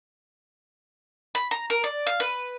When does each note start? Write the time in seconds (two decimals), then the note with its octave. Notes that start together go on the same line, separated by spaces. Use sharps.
1.35 B5
1.51 A#5
1.70 A#4
1.84 D5
2.07 F5
2.20 B4